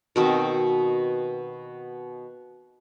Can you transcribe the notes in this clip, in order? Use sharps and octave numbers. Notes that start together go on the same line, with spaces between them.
B2 D#3 C4